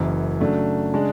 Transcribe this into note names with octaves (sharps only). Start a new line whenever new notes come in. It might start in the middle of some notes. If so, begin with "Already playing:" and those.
Already playing: F#1 F#2 E3
C#3 F#3 A3 D4
C#3 G#3 D4